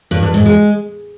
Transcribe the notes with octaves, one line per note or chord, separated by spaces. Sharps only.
G2
G2
G#2
G#3